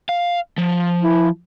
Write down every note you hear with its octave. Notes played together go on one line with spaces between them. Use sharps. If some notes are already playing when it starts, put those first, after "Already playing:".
F5
F3
E4